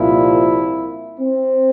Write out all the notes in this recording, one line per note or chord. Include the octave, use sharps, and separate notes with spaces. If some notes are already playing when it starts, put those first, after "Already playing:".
Already playing: C2 A#2 F3 E4
C4